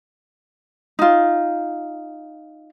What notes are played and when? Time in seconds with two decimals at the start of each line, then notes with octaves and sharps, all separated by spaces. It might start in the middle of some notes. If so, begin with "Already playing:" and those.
0.99 D#4 F4